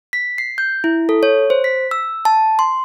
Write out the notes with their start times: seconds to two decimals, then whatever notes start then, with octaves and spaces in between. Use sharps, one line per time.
0.13 B6
0.38 C7
0.58 G6
0.84 E4
1.09 A4
1.23 C#5
1.50 C5
1.64 B6
1.91 E6
2.25 A5
2.59 C6